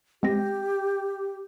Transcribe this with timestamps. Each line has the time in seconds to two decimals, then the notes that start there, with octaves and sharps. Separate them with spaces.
0.23 G#3 C4 G4 A#6